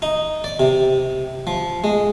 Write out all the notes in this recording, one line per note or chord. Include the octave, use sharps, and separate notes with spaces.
D#4
D5
C3
F3
G#3